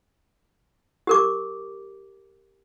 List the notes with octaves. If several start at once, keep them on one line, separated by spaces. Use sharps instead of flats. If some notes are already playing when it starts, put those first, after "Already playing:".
G4 A#4 D6